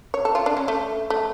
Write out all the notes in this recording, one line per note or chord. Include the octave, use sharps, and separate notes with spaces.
C#5
A4
F4
D4
C#4
A3
A3